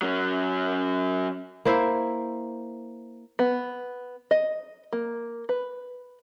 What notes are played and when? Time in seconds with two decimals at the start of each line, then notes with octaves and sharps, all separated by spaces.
0.02 F#3 C#4
1.65 A#3 E4 C5 E5
3.39 B3
4.31 D#5
4.93 A#3
5.49 B4